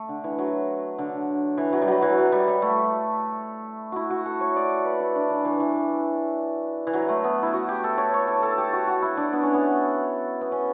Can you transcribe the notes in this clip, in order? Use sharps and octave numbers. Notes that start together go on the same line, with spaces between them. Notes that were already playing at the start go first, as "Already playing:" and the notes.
Already playing: A3
D3
E3
F#3
D3
E3
F#3
G3
F#3
E3
F#3
G3
G3
A3
E4 F#4
F#4
A4
C#5
D5
B4
E4
D4
E3
E3
E3
E3
F#3
A3
B3
E4
F#4
G4
A4
C#5
C#5
A4
A4
G4
F#4
F#4
E4
D4
B3
C#4
B3
B3
C#4